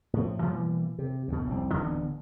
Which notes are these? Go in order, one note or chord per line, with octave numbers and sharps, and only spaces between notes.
A2 F3
B2 E3 G3 A#3
C3
D2 B2
F1 C2 C4
D1 D3 E3 B3